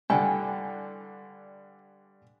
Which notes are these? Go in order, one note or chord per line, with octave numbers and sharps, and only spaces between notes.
G2 D3 E4 A4 G5 G#5